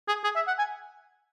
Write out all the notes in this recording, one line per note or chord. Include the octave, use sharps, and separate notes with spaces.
G#4
G#4
E5
F#5
G#5